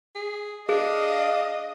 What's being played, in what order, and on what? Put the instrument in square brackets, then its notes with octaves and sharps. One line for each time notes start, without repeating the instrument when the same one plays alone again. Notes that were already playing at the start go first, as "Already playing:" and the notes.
[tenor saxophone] G#4
[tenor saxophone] D4 [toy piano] G#4 [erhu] D#5 [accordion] F5